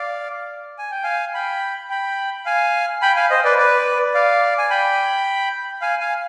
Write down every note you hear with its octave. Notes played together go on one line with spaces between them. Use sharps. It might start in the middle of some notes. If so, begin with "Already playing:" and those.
Already playing: D5 F5
G#5
G5
F5 G#5
G5 B5
G5 B5
F5 G#5
G5 B5
F5 G#5
C5 D#5
B4 D5
B4 D5
D5 F5
G#5
G5 B5
F5 G#5
F5 G#5